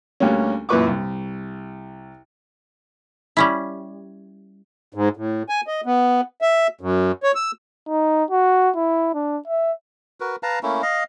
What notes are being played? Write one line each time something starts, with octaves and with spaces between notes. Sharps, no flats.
D2 D3 G3 A#3 C#4
F#2 A#2 E3 B4 C#6 D6
C2
G3 C#4 E4
G#2
A2
G#5
D#5
B3
E5
F#2
C#5
E6
D#4
F#4
E4
D4
E5
F#4 A#4 B4
B4 F5 A5 A#5
A3 A#3 C#4 E4
D#5 F5